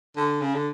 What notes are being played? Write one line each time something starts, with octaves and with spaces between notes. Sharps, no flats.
D3
C#3
D3